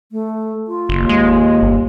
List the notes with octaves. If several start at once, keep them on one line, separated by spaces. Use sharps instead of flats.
A3
F4
F#1 D#2
G#3
G1